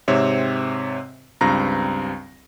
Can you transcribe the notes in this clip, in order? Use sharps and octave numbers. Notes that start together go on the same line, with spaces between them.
G#2 C3 C4 C#5 E5
C#2 G2 C4 A#5 A#6